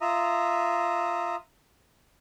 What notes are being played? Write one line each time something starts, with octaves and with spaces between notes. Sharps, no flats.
F4 E5 A#5 D#6